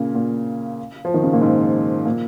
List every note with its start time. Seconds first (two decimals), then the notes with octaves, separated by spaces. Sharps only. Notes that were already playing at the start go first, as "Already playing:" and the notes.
Already playing: A#2 C#3
0.15 A#2
1.05 F3
1.14 D#3
1.23 C#3
1.33 A#2
1.42 G#2
2.06 A#2